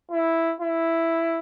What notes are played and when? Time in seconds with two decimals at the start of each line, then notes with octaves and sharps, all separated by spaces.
0.11 E4
0.61 E4